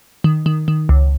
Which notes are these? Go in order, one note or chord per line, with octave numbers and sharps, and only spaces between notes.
D#3
D#3
D#3
C#2